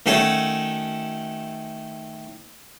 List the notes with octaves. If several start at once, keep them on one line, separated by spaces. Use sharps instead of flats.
D#3 A3 C#4 F#4 A4 C#5